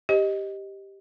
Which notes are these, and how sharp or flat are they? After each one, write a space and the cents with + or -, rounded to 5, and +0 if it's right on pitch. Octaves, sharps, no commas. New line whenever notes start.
G4 +0 C5 +0 D#5 +0